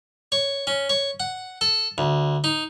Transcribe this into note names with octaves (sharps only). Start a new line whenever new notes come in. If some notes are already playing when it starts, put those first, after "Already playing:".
C#5
C#4
C#5
F#5
A4
D2
D#4